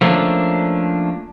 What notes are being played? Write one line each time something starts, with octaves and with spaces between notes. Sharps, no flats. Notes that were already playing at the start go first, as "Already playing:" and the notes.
F3 A3 A#3 C#4 D4